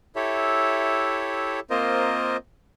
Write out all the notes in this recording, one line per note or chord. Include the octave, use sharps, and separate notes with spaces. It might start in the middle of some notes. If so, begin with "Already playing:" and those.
E4 G4 A4 C#5 E5
A#3 C4 F4 A#4 C5 D#5